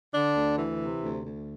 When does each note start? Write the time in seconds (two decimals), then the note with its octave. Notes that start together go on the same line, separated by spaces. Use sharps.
0.14 D3 D4
0.36 D2
0.59 E3
0.81 C3
1.03 D2
1.26 D2